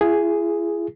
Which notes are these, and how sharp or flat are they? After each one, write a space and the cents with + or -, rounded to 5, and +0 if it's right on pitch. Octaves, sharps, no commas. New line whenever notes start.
E4 +40 G#4 +0